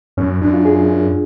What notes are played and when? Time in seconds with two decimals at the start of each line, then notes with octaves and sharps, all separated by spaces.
0.17 F#2 C#4
0.41 F#2 D4
0.54 F4
0.65 G#4